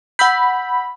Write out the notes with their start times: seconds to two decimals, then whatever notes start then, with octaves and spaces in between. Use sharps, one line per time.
0.19 F#5 B5 E6 G6